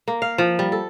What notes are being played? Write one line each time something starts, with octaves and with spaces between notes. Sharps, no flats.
A#3
F5
F3
G3
A4